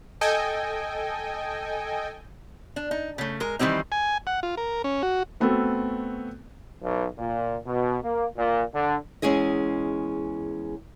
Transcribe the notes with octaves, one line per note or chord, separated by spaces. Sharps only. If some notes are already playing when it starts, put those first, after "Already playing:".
A4 D#5 G5 G#5
D4
D#4
C#3 A3
G#3 A#4
D#3 E3 G3 C4 D#4
G#5
F#5
F4
A#4
C#4
F#4
A3 B3 C4 F#4 A4
B1
A#2
B2
A#3
A#2
D3
E2 G#3 C#4 G#4 D#5